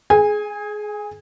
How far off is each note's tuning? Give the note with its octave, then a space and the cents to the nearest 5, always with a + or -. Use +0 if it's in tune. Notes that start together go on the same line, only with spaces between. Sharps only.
G#4 +20 G#5 -20